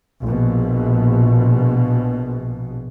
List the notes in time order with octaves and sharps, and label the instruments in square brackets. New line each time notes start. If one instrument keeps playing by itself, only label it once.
[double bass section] A#1 B2